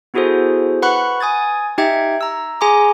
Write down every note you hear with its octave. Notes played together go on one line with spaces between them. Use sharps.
B3 E4 F#4 G#4 A4 C5
B4 F#5 B5 C#6 F#6
G#5 D#6 G#6 A6
D#4 G4 E5 G5 G#6
A#5 E6
G#4 G#5 A#5 C6 D6